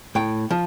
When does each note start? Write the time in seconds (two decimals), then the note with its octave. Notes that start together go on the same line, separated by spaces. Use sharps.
0.15 A2 G5
0.51 F3